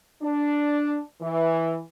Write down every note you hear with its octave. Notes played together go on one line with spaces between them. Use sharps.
D4
E3